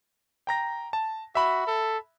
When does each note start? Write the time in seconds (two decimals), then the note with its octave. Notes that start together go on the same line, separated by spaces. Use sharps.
0.47 G5 A#5 A#6
0.93 A5
1.35 F#4 E5 B5
1.67 A4